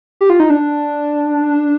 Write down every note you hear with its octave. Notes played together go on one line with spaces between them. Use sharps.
G4
F4
D#4
D4